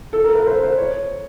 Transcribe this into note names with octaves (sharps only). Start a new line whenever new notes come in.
A4
A#4
B4
C5
C5
C#5